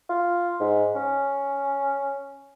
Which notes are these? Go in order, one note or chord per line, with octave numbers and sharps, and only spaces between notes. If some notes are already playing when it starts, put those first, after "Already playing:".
F4
G#2
C#4